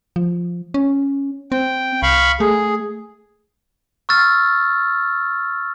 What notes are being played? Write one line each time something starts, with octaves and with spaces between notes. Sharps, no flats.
F3
C#4
C4 G5
C2 F5 B5 C#6
A3 G#4
C#6 E6 F6 A6